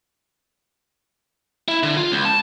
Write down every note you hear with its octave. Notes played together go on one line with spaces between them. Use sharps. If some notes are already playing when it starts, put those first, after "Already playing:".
E4
D3
F4
C#2
A5